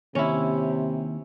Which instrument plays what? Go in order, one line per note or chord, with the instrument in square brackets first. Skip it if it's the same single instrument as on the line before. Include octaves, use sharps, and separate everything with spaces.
[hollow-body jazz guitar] D#2 [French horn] C3 [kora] C#4 E4